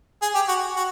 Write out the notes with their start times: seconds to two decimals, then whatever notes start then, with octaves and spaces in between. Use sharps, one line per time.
0.22 G#4
0.35 G4
0.48 F#4
0.76 F#4